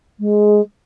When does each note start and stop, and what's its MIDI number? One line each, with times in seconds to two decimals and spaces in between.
0.20 0.61 56